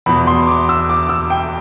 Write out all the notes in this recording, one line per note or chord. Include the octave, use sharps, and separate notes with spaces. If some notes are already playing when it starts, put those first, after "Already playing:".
E2 B2 B5
C6
D6
E6
D6
E6
G5